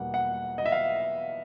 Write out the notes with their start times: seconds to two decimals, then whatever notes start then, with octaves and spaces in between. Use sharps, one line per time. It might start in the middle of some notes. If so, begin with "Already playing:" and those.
Already playing: E2 B2 G3 A#3 F#5
0.14 F#5
0.58 D#5
0.66 E5
0.72 F5